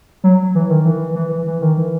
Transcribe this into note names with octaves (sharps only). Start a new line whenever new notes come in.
F#3
E3
D#3
E3
E3
E3
E3
D#3
E3